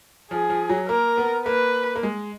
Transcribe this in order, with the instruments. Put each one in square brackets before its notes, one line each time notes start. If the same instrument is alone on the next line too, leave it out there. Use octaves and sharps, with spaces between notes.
[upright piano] F3 [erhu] G#4
[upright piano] F3
F#3
[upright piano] A#3 [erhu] A#4
[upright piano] B3
[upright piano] A#3 [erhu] B4
[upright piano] A#3
G#3